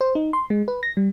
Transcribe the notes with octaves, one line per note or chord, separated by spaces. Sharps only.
C5
D#4
C6
G#3
B4
A#6
G3